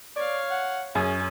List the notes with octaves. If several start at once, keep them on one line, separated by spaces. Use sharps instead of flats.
C#5 D5 F5
F#5
F#2 C#4 G#4